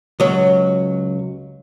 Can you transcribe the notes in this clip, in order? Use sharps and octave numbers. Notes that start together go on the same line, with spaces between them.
C#2 F#3